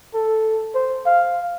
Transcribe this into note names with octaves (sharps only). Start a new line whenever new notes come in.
A4
C5
F5